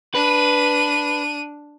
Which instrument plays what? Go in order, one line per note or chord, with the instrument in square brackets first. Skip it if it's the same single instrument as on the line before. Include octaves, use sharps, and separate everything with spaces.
[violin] D4 D#7 [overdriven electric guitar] B4